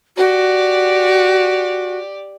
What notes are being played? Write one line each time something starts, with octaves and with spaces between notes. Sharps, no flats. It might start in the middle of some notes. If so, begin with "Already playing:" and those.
F#4 G4 D5